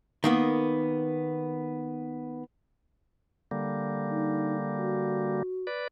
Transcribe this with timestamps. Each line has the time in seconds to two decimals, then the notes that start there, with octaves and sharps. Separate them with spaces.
0.24 D#3 A#3 B3
3.51 D3 G3 A#3
4.09 D#4
4.76 F#4
5.67 B4 D5